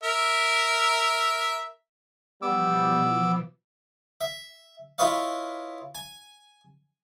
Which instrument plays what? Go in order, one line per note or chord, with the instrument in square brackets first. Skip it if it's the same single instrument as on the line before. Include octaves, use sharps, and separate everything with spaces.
[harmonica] A#4 E5
[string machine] B2 E3 F3 [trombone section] G3 [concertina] B3 D6 E6
[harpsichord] E5
E4 F4 B4 C#5 D#5 F5
G#5